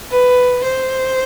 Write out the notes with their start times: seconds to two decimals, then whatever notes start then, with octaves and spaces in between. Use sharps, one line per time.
0.11 B4
0.63 C5